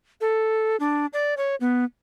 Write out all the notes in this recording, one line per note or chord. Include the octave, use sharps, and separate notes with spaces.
A4
D4
D5
C#5
B3